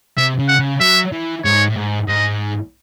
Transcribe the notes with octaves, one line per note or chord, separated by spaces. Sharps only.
C3 E5
C#3
F#5
C#3
F#3 E5
E3
G#2 C#5
A2
G#2
G#2 D#5